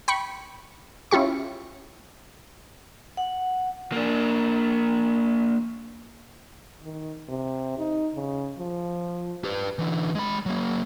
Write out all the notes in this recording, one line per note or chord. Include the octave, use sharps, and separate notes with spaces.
G5 B5 C#6
C#4 E4 F4 G4 C#6
F#5
A#3 D4
D#3
C3
D#4
C#3
F3
G4 B4
D3 E3
G#3 B5
F#3 A#3